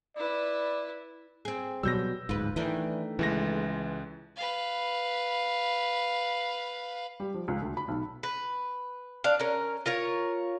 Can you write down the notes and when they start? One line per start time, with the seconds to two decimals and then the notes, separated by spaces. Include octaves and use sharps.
0.16 E4 B4 D5
1.45 C4 G#4
1.83 B2 F#3 G3 E6 G6 A#6
2.29 D1 G#1 G#2 F4 B4
2.56 D#3 E3 A3 D4
3.19 C#2 E3 G#3 A#6
4.36 B4 F5
7.20 G3
7.34 F3
7.48 C#2
7.62 D2
7.77 B5
7.88 B1
8.23 B4
9.24 D4 F5
9.40 C#4 A#4
9.86 F4 A#4 C#5